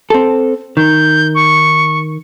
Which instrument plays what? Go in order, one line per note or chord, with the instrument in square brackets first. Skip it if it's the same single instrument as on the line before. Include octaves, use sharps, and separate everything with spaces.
[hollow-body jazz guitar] C4 A4
[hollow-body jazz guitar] D#3 [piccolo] G6
[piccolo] C#6